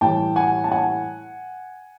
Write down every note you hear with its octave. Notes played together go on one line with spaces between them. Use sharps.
A2 E3 G3 G5 A5
F#5 G#5
A5
F#5 G#5